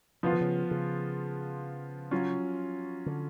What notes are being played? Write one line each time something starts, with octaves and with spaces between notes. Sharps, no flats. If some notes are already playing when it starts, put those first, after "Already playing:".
C#3 F3 B3 F4
D3
C#3
C#3
F#3 C#4 F4
D3